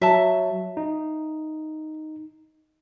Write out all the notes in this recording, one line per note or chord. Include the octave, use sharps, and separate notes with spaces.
F#3 E5 A5
D#4